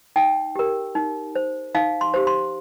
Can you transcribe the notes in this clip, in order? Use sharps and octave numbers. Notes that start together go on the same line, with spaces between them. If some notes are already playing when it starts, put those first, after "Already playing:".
D#4 G5
G4 A#4
D#4
C5
D#4 F5
C6
G4 C5
C6